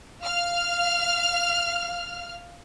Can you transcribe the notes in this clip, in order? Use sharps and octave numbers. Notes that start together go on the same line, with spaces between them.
F5 F6